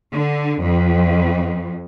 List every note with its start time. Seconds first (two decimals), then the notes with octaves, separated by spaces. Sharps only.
0.11 D3
0.63 F2